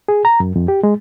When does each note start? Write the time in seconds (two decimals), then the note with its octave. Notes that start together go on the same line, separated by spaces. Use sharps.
0.08 G#4
0.25 A#5
0.40 F#2
0.56 F2
0.68 G4
0.83 G#3